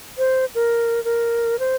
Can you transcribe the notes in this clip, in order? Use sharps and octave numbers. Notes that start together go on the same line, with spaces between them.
C5
A#4
A#4
C5